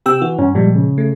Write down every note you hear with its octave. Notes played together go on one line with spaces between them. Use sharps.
C3 G4 G5 E6
E3 F#4
G2 C#4
A#2 F3 G3 G#3
C#3
A3